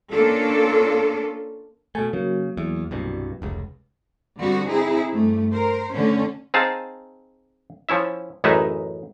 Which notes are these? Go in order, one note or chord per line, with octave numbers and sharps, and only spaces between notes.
A#3 C#4 D4 F4 A4
B2 A3 G#5
C#3 F#3 A#3
E2
C2 G2 B2
F1 C#2
D3 G3 B3 C4 F#4
C4 D#4 E4 G#4
G2 A3
A#4 C5
D3 A3 C#4
C4 D#4 G#4 F5 A5
F3 C#4 E4 E5
A1 F#2 G#3 D#4 B4 E5